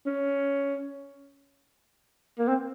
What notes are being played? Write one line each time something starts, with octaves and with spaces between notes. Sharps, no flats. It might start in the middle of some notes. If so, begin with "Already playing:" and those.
C#4
A#3
C4